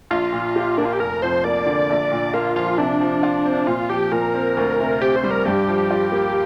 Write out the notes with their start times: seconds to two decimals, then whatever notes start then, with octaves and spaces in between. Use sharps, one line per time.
0.11 A#1 F4
0.33 A#2
0.56 G4
0.78 A#3 D4
0.85 F4
0.93 G4
0.99 F1 A#4
1.22 F2 C5
1.44 A#3 D5
1.66 D3
1.90 A#1
2.12 A#2
2.34 A#3 F4
2.56 F3 F4
2.78 C3 D4
3.01 F3
3.23 F4
3.45 C4
3.67 A#2 F4
3.90 F3 G4
4.12 A#2 A#4
4.34 C4
4.57 D2
4.79 C3
5.01 C4 G4
5.16 C5
5.23 G3
5.31 A#4
5.46 G2 G4
5.68 F3
5.90 F4
6.12 A#3